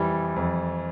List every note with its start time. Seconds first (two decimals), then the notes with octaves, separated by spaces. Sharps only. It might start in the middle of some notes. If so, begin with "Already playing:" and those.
Already playing: F2 E3 G3
0.36 F2